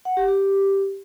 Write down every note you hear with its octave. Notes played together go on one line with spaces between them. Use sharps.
F#5
G4
G4